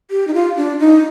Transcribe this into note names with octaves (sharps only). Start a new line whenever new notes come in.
G4
D#4
F4
D4
D#4